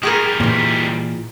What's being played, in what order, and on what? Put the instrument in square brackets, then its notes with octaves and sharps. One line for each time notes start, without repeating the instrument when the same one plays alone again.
[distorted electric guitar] D#3 G3 [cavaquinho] G4 G#4 A#4
[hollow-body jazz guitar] A#2 E3